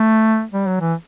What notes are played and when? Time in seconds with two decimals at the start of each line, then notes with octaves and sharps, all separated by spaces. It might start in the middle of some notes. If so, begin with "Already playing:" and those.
Already playing: A3
0.52 G3
0.67 F#3
0.81 E3